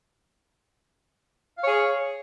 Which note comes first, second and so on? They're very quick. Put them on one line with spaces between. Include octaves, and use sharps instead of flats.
F5 C#5 G#4